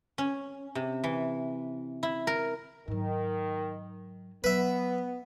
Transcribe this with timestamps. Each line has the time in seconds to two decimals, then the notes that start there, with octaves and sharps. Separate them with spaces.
0.18 C#4
0.75 C3
1.04 E3
2.03 E4
2.27 A#4
2.88 G#2 D#3 F#3
4.44 F#3 B3 B4 E5